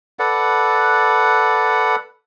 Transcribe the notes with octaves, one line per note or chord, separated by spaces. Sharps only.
A4 B4 D5 F#5